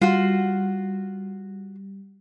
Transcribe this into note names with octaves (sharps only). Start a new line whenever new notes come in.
G3 F4 F#4